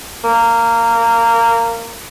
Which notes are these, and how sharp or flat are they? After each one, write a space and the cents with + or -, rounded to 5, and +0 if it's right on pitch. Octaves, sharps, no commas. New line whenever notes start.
A#3 -15